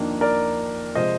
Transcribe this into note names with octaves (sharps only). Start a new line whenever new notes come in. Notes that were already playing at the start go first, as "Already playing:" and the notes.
Already playing: F2 D#3 A#3 D4
A#4 D5
C3 F3 G#3 C5 D#5